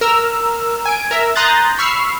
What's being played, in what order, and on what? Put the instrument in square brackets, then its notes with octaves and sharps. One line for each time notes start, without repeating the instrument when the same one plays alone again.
[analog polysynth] A#4 E6 F6
G#5 D7
A#4 E5
A#5 C6 D#6 F#6 G6 A6
B5 C#6 E6 F6 C7